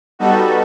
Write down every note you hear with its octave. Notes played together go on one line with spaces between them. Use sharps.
G3 B3 D#4 F#4 A4